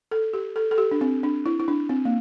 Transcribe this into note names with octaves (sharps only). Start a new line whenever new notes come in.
A4
G4
A4
A4
G4
D4
C4
D4
E4
E4
D4
C4
A#3